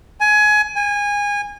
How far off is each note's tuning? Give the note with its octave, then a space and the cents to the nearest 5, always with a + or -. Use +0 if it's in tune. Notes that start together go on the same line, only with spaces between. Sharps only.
G#5 +20
G#5 -25